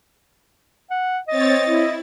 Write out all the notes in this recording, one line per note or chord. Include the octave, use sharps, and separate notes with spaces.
F#5
C4 C#5 D#5 A6
E4